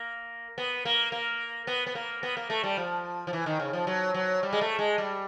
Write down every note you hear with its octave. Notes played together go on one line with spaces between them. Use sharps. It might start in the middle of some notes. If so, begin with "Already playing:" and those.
Already playing: A#3
B3
A#3
A#3
B3
B3
A#3
B3
A#3
A3
G3
F3
F3
E3
D#3
C#3
F3
F#3
F#3
G3
G#3
A3
G#3
G3